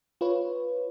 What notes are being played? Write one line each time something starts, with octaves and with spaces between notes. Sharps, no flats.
F4 B4 C#5